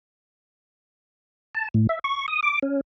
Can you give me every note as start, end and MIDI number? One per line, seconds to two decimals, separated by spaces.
1.55 1.68 81
1.74 1.87 45
1.89 1.99 76
2.04 2.26 85
2.28 2.40 87
2.43 2.59 86
2.63 2.81 61